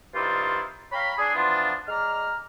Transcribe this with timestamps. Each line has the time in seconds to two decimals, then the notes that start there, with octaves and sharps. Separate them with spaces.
0.14 G2 D#3 E4 F4 C5 D5
0.92 C#5 F5 G5 A#5 B5
1.18 D4 G#4
1.35 E3 F3 B3 D4 F4
1.88 G#3 D5 A#5 F6